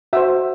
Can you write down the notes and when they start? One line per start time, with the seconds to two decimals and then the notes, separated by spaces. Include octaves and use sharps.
0.13 F#4 C5 E5